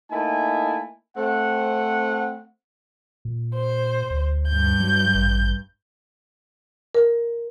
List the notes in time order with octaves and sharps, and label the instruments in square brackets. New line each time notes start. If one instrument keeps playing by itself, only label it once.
[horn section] A3 A#3 D#4 E4 G#5 A5
A3 C4 F#5
[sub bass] A#2
[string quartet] C5
[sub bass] D2
[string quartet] G2 G6
[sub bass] F#3
A1
[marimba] A#4